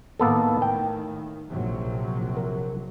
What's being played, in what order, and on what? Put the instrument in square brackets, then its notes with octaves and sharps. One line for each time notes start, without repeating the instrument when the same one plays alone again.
[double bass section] A2 D#3 [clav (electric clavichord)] A#3 B3 A4
[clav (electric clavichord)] G5
[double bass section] A#1 C3 F#3
[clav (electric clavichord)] A#4